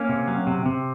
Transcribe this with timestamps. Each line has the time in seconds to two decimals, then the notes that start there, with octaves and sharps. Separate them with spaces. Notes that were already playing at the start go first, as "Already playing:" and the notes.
Already playing: A#3 C#4
0.09 C3
0.28 F#3
0.47 C3
0.66 C3